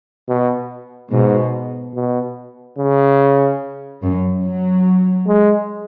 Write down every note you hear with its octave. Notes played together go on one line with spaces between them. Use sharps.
B2
G#2 B2
B2
C#3
F#2
F#3
G#3